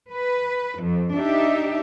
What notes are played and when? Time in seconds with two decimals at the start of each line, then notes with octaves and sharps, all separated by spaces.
0.12 B4
0.81 F2
1.17 D4 D#4 G4 E5